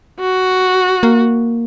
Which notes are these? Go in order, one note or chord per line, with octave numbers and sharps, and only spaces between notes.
F#4
A#3